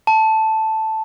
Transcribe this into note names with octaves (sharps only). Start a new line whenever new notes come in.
A5